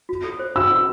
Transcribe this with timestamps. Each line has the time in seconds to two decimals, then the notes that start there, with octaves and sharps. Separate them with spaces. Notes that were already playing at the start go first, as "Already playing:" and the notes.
0.09 F#4
0.24 A4
0.39 C5
0.56 F#4 E6
0.71 F#4